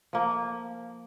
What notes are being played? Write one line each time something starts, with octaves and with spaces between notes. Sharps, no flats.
F3 A#3